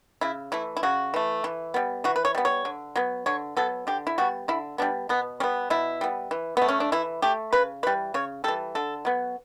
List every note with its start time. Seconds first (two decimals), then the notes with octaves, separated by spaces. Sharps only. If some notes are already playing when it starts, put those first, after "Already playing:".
0.21 C#3 E4
0.52 E3 A3 E4
0.77 E4
0.83 C#3 F#4
1.14 E3 A3
1.44 E3
1.74 G3 B3
2.04 E3 F#4
2.16 B4
2.25 C#5
2.35 G3 B3
2.45 C#5
2.65 D3
2.96 F#3 B3
3.26 D3 C#5
3.57 F#3 B3 A4
3.87 D3 G4
4.07 E4
4.18 G3 B3 F#4
4.48 D3 E4
4.78 G3 B3 D4
5.09 B2 B3
5.40 G3 B3 C#4
5.70 B2 E4
6.01 G3 B3
6.31 E3
6.57 A3 B3
6.69 C#4
6.80 D4
6.92 E3 E4
7.22 A3 G4
7.53 C#3 B4
7.83 E3 G3 B4
8.14 C#3 C#5
8.44 G3 A4
8.48 E3
8.75 D3 A4
9.05 F#3 B3